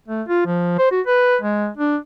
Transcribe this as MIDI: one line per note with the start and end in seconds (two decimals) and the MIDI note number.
0.08 0.22 57
0.28 0.42 65
0.46 0.76 53
0.78 0.91 72
0.91 1.01 66
1.07 1.36 71
1.41 1.68 56
1.77 1.96 62